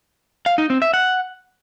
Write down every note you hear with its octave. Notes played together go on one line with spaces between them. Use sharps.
F5
D#4
C4
E5
F#5